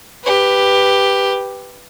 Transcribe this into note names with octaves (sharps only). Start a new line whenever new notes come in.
G4 B4